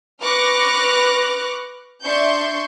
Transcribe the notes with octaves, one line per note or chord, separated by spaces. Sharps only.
B4 C#6 D6 F6 F#6 A#6
D4 E5 C6 C#6 G6